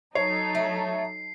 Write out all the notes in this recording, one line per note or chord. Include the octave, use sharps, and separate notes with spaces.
F#3 D#4 A4 C#5 C7
A3